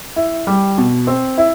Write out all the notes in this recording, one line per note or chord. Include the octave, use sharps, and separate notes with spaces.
E4
G3
B2
C4
E4